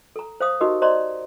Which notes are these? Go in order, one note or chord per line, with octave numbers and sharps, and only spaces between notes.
A4 A#5
C5 F5 D#6
D#4 F#4 G4 A#4 D#5
C5 D5 D#5 A#5 C6